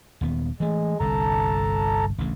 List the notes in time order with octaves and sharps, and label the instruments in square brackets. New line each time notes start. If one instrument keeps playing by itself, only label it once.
[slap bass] D#1 D#2 B3
[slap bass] E3 A3 [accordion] G#3
[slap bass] G1 C2 G2 [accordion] A4 A5 A#5
[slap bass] A1 D2 C#3